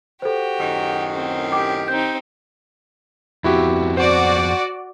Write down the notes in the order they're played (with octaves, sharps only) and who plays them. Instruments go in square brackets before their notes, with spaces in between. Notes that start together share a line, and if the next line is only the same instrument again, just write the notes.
[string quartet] F#4 [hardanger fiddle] G4 [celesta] A4 C5
[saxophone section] F#2 A2 D#3
[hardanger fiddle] C4
[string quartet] G4 [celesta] G5 D6
[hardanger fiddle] C4 D#4 [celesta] G6
[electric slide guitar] F2 B3 C4 [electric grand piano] E4 F#4 G4
[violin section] F#4 D5 [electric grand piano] C5